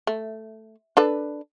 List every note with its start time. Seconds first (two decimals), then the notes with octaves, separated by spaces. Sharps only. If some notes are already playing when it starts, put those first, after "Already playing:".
0.07 A3
0.97 D4 A4 B4